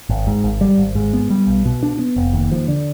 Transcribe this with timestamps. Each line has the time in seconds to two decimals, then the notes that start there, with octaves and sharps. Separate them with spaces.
0.09 G#1
0.27 G#2
0.44 G#1
0.61 G3
0.78 G#1
0.95 G#2
1.13 B3
1.30 G3
1.47 B1
1.65 B2
1.83 D4
1.99 B3
2.16 F1
2.33 D#2
2.52 F3
2.68 D3